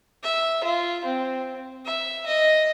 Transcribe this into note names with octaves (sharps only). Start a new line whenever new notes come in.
E5
F4
C4
E5
D#5